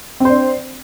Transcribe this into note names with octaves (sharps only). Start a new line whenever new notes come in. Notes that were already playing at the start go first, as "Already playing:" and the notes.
C4 D4 C5